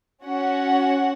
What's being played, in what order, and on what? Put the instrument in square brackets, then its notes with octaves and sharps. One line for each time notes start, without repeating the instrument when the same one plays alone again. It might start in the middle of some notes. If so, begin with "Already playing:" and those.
[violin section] C#4 F#4 F#5